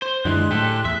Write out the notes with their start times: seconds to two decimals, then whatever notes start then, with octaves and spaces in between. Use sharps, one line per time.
0.02 C5
0.25 F#2 D3 E3 G#3 C6 F#6
0.51 A2 G4 A4
0.85 E2 E5